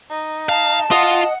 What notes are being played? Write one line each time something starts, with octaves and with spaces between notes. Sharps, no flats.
D#4
F5 A5
F4 D#5 F#5